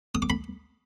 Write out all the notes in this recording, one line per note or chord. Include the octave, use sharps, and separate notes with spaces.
D#6
D6
B5